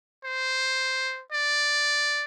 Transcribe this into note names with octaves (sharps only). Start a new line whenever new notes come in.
C5
D5